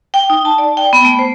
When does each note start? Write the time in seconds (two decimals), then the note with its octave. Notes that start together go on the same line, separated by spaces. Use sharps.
0.14 G5
0.30 D#4
0.45 A5
0.58 D5
0.77 G5
0.93 B3
1.05 A3
1.19 C5